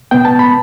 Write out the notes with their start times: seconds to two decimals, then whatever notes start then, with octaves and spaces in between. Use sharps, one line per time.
0.11 B2 B3 G5
0.25 A5
0.39 B5